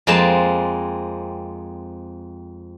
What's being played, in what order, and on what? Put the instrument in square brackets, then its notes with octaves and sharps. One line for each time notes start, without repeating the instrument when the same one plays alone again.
[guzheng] F2 G#3 A#3 C4 A5